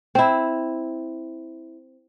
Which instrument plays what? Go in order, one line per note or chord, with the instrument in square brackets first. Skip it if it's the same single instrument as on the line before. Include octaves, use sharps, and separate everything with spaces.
[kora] C4 E4